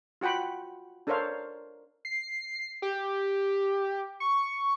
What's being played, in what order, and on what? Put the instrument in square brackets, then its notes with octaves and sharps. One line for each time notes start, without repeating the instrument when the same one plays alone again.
[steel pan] F4 F#4 F#5 G5 B5
D4 A4 A#4 C5 C#5 F5
[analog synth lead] C7
G4
C#6